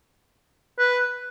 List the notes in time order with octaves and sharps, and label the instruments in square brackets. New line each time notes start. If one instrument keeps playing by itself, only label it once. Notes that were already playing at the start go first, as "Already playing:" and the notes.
[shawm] B4